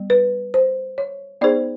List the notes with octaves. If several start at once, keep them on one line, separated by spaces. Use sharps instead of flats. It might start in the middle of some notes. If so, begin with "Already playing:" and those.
Already playing: G3 B3
B4
C5
C#5
B3 D#4 G#4 C5 D5